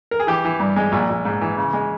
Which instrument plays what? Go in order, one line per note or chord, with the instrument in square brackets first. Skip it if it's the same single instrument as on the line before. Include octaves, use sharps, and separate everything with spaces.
[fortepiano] A#4
G#4
E3 G4
E3
G2
G#3
A#1
A#1
G#2
E3
C#3
G#3